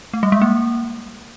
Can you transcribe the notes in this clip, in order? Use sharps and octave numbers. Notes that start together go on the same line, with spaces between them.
A3
G3
G#3
A#3